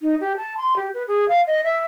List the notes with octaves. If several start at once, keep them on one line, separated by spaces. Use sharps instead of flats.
D#4
G4
A5
C6
G4
B4
G#4
F5
D#5
E5